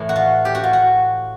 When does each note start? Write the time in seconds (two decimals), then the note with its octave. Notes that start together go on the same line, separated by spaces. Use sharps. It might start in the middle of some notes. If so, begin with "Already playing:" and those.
Already playing: A2 E3
0.09 F#4
0.16 F4
0.45 G4
0.55 F#4
0.64 F4
0.73 F#4